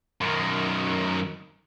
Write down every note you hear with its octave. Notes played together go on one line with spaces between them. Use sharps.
F#2 D#3